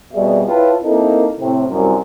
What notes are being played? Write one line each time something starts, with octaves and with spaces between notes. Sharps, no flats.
F2 B2 G3 G#4 D5 E5
E4 F4 B4 C#5 G5 A5
A#3 C4 D#4 E4 A4 A#4
A2 C3 C4
C2 F#2